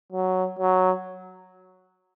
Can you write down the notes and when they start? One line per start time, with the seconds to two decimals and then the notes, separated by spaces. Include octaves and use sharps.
0.13 F#3
0.59 F#3